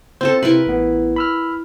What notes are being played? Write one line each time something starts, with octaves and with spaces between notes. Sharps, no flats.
C4 F4 A4 C5
C3 E4 A#4 B4
A1 B3
B5 E6 F6